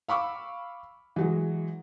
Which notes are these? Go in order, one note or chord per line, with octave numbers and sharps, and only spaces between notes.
F5 B5 C#6 D6 E6
E3 F#3 G#3